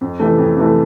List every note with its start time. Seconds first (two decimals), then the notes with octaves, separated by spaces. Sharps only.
0.01 F2
0.20 C3 E3 A3
0.38 F2
0.57 C3 E3 A3